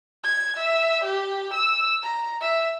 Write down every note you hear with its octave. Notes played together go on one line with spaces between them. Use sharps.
G#6
E5
G4
E6
A#5
E5